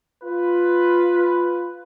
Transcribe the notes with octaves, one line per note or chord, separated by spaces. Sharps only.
F4 B4